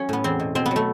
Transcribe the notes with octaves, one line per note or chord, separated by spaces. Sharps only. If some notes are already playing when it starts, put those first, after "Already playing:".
Already playing: F#3 C#4
A2 B3
E2 C4
B2
B2 C4
B3
F#3
A3